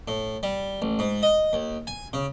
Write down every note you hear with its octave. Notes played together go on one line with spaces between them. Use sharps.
A2
G3
A1
G#2
D#5
D#2
G#5
C#3